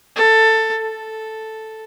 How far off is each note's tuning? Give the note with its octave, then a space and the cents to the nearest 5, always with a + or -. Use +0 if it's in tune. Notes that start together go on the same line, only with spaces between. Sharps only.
A4 +15
A4 +0